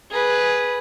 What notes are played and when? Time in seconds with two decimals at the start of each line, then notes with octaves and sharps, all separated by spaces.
0.11 G#4 B4